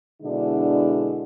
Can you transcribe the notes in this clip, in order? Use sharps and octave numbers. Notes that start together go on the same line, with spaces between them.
B2 D3 G#3 D4 E4